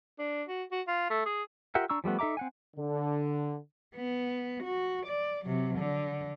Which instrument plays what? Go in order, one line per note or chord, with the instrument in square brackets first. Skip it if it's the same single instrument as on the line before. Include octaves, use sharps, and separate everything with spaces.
[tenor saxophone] D4
F#4
F#4
F4
A3
G#4
[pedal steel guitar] F4 G4 A#4 E5 F#5
D4 A#5 C#6 E6
F3 G3 A3 B3
D#4 A4 E5 A#5 D6
C4 F#5 G#5
[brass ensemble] D3
[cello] B3
F#4
D5
C3 F#3
D3